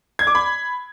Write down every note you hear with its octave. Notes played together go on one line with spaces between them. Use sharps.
G#6
D6
B5